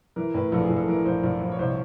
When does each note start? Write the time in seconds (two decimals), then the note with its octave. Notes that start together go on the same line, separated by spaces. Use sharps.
0.16 E3 A#4
0.34 A2 B4
0.52 A#1 A4
0.64 G#4
0.69 A#1
0.76 A4
0.88 E3 A#4
1.05 A#1 C5
1.23 A#1
1.41 A#1
1.52 C#5
1.59 C2 C5
1.68 C#5